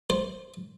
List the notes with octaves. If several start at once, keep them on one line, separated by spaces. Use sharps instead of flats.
C5